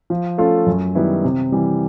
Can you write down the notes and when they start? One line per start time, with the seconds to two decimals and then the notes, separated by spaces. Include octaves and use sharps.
0.10 F3
0.38 A3 C#4 F4 A4
0.66 F#2
0.95 D#3 G3 B3 E4
1.24 C3
1.52 E3 G3